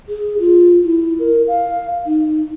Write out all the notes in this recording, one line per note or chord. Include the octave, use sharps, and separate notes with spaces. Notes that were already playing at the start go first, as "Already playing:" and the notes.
G#4
F4
E4
A#4
F5
D#4